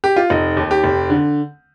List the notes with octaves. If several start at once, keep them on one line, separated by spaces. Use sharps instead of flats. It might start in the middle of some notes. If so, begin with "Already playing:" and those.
G4
F4
F1 D#4
D#2
G4
F1
D3